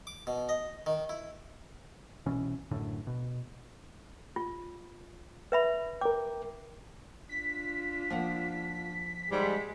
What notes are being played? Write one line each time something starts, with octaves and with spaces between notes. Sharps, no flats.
D6
B2
D#5
D#3
E4
C2 B2 E3 C#4
A1 F#2 A2 D3
B2
F4
B4 E5 B5
A#4 G5 D6
D4 F4 B6
F3 A#3 F#5
G#2 G3 G#3